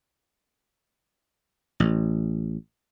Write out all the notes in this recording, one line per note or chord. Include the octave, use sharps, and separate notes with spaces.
A1